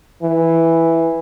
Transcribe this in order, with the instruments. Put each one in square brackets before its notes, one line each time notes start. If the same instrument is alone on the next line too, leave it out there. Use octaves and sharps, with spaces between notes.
[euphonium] E3